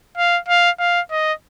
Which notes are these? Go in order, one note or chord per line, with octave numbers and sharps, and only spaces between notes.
F5
F5
F5
D#5